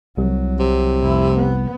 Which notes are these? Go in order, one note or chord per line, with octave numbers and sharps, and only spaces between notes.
C2 F#3
C3
F1 E4
B3